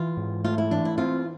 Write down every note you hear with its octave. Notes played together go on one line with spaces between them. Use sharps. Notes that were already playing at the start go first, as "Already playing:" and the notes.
Already playing: E3 F4
G#2
A3 F4
E4
E3 D4
E4
C4 F4